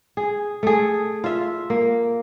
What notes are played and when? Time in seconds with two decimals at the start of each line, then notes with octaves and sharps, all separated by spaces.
0.17 G#4
0.63 A3 G#4
1.24 F4 E5
1.70 A#3